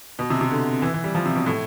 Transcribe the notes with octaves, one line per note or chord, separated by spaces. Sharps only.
B2
C3
C3
D3
E3
E3
G3
F3
C3
B2
A2